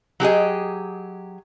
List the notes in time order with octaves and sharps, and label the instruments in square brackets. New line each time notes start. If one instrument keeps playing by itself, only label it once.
[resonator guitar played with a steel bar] F#3 G4 G#4 D#5